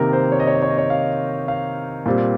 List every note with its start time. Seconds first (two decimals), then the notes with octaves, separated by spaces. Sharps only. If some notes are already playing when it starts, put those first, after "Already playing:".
Already playing: C3 D#3 A#3 A#4
0.13 C5
0.32 C#5
0.40 D#5
0.47 C#5
0.55 D#5
0.62 C#5
0.70 D#5
0.78 C#5
0.90 F5
1.48 F5
2.06 A#2 G3 C4